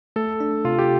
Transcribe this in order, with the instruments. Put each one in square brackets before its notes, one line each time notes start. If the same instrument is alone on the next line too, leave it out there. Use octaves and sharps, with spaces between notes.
[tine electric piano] A3 [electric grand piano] A4
[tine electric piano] D4
[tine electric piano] C3 [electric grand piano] F4
[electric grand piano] G4